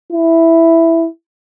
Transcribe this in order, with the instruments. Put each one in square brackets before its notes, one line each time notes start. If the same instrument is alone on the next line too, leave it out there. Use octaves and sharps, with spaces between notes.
[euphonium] E4